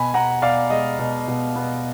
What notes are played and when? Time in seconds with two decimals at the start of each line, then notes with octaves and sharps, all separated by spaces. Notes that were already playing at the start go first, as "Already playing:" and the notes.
Already playing: B2 G#5 B5
0.14 B2 F#5 A#5
0.42 B2 D5 F5
0.70 G#3 D#5
0.99 B2
1.28 B2
1.56 B3